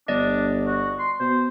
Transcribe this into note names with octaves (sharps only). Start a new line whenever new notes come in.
G1 D4 D5 D#5
F#4
C6
B2 C5